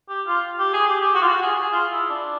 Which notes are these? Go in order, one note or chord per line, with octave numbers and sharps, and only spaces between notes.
G4
F4
G4
G#4
G4
G4
F#4
F4
F#4
G#4
G#4
F4
E4
D4